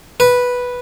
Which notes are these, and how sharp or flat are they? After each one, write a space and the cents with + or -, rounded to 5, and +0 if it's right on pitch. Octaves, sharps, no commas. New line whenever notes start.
B4 -5